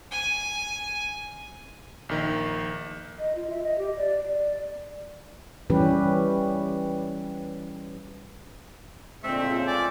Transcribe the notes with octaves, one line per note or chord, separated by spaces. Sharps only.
G#5
A#1 D#3
D#5
F4
E5
D#5
G4
D5
D5
E3 G3 C#4 G4 B4
A#2 D3 G#3 A3 C4 E5
A#2 C#3 F4 F5
F4 D5 G#5